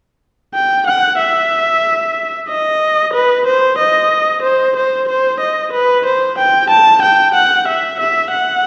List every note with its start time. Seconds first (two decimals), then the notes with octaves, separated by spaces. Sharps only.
0.54 G5
0.87 F#5
1.19 E5
2.49 D#5
3.13 B4
3.46 C5
3.78 D#5
4.43 C5
4.76 C5
5.08 C5
5.40 D#5
5.73 B4
6.06 C5
6.38 G5
6.70 A5
7.02 G5
7.35 F#5
7.68 E5
8.00 E5
8.32 F#5